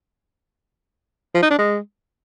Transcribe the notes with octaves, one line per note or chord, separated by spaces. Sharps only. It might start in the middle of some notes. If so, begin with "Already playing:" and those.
F3
D#4
D4
G#3